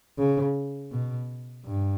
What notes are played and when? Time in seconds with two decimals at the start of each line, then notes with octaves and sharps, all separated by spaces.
0.18 C#3
0.92 B2
1.66 G2